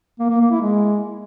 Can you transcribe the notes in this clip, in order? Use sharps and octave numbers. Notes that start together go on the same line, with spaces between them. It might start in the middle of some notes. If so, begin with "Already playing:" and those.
A#3
A#3
A#3
E4
G#3